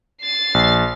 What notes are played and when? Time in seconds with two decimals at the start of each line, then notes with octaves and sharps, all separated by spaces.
0.22 A6 C7
0.54 A#1